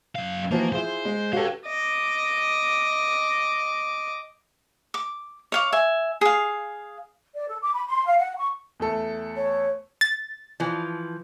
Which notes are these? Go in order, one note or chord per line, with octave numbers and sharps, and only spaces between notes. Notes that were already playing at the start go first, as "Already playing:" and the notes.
F#2 F5
E3 F3 A#3 F#4
E4 F4 G#4 C5
G#3
F#4 G4 A4 B4 F5
D#5 D6
D6
C#5 F5 D6
E5 G#5
G#4 F5
D5
A4
D6
B5
C6
F5
F#5
C#6
E2 A3 A4
C#5
A6
E3 F3